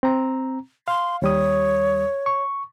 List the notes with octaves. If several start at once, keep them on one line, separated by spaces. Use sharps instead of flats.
C4 A#5
F5 C6
D#2 G3 C#5 D#6
C#6